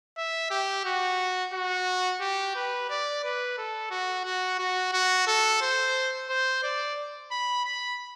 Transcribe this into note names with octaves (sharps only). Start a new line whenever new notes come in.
E5
G4
F#4
F#4
G4
B4
D5
B4
A4
F#4
F#4
F#4
F#4
A4
C5
C5
D5
B5
B5